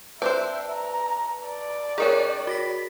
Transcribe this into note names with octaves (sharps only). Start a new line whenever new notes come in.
C4 D4 B4 C5 E5 A5
A#5
D5
D#3 C#4 G#4 A#4 C#5
F#4 A#6 B6